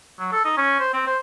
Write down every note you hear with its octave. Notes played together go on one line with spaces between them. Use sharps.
F#3
A4
D#4
C#4
C5
C4
C5